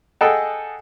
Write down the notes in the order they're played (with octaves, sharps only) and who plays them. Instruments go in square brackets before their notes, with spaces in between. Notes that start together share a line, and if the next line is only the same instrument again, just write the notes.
[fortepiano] G#4 A4 D#5 F#5 G5 A5